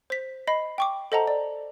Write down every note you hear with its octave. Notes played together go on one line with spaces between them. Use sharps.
C5 B6
D#5 B5 C7
G5 C#6 D6
A4 C5 D#5 F#5 A5 A#5
D5